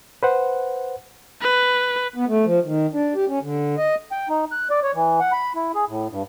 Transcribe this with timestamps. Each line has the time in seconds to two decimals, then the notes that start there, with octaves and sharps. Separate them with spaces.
0.23 B4 C5 F#5
1.41 B4
2.15 B3
2.28 A3
2.45 F3
2.64 D#3
2.93 D4
3.15 G4
3.28 C#4
3.42 D3
3.78 D#5
4.12 G5
4.29 D#4
4.52 F#6
4.70 D5
4.83 C#5
4.94 E3
5.20 F#5
5.33 B5
5.55 E4
5.75 G#4
5.88 A2
6.10 G2